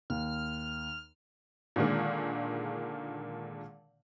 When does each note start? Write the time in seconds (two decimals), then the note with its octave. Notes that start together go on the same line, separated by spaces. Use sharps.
0.10 D#2 F6
1.76 A#2 D3 D#3 G#3 A#3